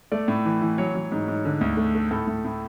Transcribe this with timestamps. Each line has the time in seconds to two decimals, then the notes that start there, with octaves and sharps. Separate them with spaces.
0.12 A3 D5
0.28 A2
0.45 E3
0.62 E3
0.78 F#3 C#5
0.95 F#3
1.12 G#2
1.28 G#2
1.45 D3
1.61 D2
1.77 A3
1.95 A3
2.11 A2 A4
2.27 A2
2.45 A2